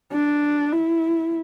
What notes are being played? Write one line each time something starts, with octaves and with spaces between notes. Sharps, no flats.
D4
E4